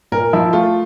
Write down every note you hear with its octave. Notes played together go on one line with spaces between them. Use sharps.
A#2 A#4
F3 E4
A3 F4